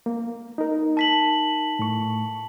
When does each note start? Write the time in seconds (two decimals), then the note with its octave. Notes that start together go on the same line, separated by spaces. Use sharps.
0.06 A#3
0.58 D#4 A#4
0.97 A5 B6 F#7
1.79 A2 C#6